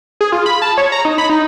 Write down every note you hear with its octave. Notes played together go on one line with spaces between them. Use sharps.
G#4
F4
B5
A5
C#5
A#5
D#4
B5
D#4